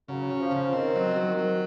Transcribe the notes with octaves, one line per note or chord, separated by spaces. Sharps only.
C#3 F#3
C#4
F3
C#3
D#3 C4
F#3
F#3
F#3